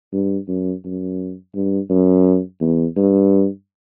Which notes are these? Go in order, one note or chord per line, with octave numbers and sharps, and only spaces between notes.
G2
F#2
F#2
G2
F#2
E2
G2